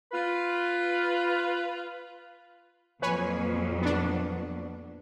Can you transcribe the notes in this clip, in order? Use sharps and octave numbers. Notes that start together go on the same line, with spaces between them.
F4 B4
F2 A#2 F#3 B4 C#5 G#5
B3 D4